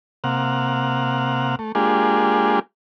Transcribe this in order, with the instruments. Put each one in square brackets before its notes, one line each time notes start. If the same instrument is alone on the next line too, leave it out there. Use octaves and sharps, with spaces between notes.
[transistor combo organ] C3 A#3 F5 F#5
A3
G#3 A#3 D4 F4 G4 G#4